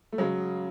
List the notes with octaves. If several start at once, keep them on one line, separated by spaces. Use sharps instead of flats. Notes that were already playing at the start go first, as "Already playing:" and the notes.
A3
C#3 F#3 G#3